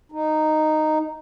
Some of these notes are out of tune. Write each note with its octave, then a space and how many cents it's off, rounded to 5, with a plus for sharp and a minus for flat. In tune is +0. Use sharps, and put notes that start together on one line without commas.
D#4 -10